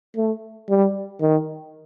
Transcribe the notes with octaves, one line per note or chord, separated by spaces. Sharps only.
A3
G3
D#3